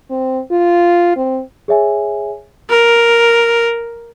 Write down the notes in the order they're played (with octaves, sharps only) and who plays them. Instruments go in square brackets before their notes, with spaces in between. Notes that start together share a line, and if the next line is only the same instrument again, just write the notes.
[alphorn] C4
F4
C4
[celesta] G#4 C#5 E5 G#5
[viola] A#4